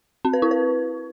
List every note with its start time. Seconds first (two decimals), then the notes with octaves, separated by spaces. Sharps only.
0.25 C4
0.33 B4
0.42 E4
0.51 B4